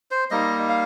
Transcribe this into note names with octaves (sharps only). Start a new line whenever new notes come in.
C5
G3 A#3 D#4 D#5
F5